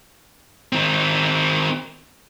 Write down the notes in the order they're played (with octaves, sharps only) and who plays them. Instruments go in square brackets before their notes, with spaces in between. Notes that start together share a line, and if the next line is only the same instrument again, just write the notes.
[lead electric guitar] D#3 C4